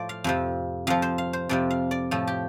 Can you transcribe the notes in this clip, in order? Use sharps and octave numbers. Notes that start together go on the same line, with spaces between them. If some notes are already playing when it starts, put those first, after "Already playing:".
Already playing: A2 F3 C5 D5
F5
F2 C3 F3
F2 F3 F5
C5
F5
C5
F2 C3 F3 D5
F5
D5
A2 F3 A4
G4